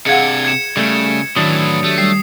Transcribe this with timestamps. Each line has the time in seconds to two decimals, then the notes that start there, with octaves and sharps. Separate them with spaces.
0.06 C3 D4 G#4 F5 F#5 G#6 C#7
0.45 G#6 C#7 E7
0.77 C#3 G3 A3
1.36 A2 D#3 E3 F#3 D4 D#6
1.84 A3 G4
1.98 G3 C7